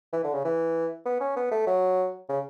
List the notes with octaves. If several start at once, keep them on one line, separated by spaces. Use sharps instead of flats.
E3
D3
C#3
E3
B3
C#4
B3
A3
F#3
C#3